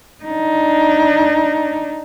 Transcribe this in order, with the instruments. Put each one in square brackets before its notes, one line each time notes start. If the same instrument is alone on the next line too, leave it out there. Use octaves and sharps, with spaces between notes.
[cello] D4 D#4